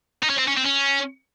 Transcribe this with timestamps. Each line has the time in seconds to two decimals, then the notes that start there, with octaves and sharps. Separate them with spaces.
0.23 D#4
0.30 C#4
0.38 C4
0.48 C#4
0.57 C4
0.66 C#4